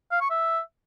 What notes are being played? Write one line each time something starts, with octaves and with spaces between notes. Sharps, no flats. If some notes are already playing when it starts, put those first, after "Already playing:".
F5
C#6
E5